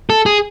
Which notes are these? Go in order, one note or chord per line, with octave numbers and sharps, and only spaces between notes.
A4
G#4